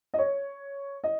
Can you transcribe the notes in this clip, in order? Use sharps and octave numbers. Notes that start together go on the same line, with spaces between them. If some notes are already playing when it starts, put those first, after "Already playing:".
D#5
C#5
D#5